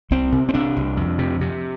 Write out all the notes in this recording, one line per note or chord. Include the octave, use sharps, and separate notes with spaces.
C2 C4
C3
C4
C3 D4
C2
F2
C3
C3